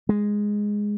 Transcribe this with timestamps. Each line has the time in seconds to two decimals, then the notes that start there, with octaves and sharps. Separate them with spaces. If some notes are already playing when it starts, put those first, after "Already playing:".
0.09 G#3